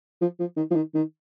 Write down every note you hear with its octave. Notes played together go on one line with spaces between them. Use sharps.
F3
F3
D#3
F3
D#3
D#3